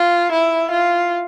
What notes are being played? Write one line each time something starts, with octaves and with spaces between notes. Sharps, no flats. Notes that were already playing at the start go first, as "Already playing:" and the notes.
Already playing: F4
E4
F4